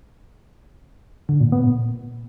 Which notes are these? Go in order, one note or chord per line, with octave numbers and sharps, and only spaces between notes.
D3
A#2
B3
A#2